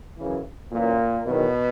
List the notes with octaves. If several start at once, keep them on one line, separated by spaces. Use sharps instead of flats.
F#2 C#3 E3
F#2 A#2 E3 A#3
E2 B2 D#3 F#3 B3